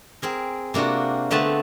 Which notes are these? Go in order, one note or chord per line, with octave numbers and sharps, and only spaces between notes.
C4 G#4 A#4
C3 A#3 D4 F4 F#4
D3 A3 B3 C4 B4 A5